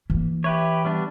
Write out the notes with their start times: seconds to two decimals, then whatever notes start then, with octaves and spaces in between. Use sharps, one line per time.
0.10 E3 A#3
0.44 G4 B4 C#5 E5
0.85 G3 B3 D4